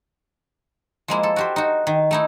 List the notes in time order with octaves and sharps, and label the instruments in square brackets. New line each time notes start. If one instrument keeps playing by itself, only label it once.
[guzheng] F3 G#3 A#3 E4
A4
F#4 G4 C5
D#4 F#4
D#3
A3 D#4 E4